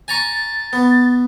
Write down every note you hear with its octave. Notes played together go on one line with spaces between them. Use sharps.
G#5 A#5 C#6 A6
B3